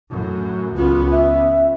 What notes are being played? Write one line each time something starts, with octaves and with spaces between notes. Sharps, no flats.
F#2 A2
C#2 B3 C#4 F4
E5